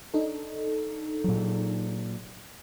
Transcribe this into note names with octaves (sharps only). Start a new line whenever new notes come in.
D4 D#4 A4
A#2 F#3